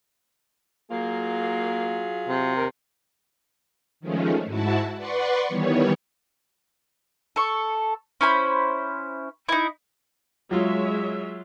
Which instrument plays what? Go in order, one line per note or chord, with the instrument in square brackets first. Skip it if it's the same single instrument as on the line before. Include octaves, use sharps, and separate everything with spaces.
[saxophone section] F#3 F4 G#4 [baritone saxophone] A#3
[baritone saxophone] C3
[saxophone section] D#2 A#4
[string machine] D#3 F3 G#3 A3 C#4
G#2 E4 F#4 A5
B4 D5 F#5 C6 C#6
D#3 E3 G3 B3 C#5
[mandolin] A4 C#6
C#4 E4 C5 B5
D#4 E4
[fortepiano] F#3 F4 [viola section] G#3 C#5 E5